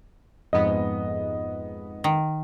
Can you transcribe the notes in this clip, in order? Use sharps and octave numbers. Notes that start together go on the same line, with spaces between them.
F2 G#2 B3 D#5
D#3